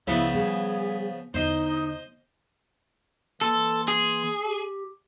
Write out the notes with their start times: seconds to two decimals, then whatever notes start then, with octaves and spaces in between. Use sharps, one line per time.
0.07 C#2 C#3 F3 B3 E4
0.34 G3 G#4
1.34 E2 D3 D#4 C5 D#5
3.41 E3 A#3 A4 C6
3.88 G#4
4.45 G4